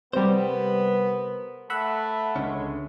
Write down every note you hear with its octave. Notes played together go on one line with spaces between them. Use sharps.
C3 G3 B3 A#4 C5
A3 E5 F#5 B5
C#2 D3 G#3 C#4